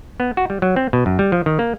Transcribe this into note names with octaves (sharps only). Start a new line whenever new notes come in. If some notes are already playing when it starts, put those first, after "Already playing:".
B3
F#4
G3
F#3
C4
B2
F#2
G3
F3
D#3
A#3